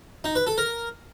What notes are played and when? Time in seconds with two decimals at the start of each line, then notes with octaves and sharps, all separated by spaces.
0.24 D#4
0.35 B4
0.47 A4
0.58 A#4